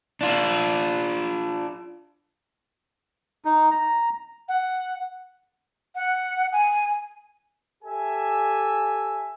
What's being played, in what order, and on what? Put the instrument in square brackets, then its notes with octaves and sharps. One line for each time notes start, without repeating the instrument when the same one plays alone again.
[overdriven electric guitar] D4 F4
[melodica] D#4
A#5
[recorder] F#5
[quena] F#5
G#5
[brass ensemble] G4 A4 E5 G#5